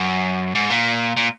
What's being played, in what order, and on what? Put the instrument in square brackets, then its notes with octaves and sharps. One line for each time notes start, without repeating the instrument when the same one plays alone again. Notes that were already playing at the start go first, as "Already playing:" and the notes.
Already playing: [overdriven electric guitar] F#2
G#2
A#2
A#2